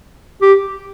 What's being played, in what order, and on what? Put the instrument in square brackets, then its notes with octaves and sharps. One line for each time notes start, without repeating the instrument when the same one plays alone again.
[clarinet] G4